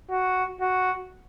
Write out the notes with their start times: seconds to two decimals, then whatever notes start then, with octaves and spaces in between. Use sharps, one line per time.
0.10 F#4
0.61 F#4